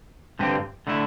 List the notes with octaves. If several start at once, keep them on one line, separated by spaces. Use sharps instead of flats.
G2 D3 C4 G4
D3 A3 E4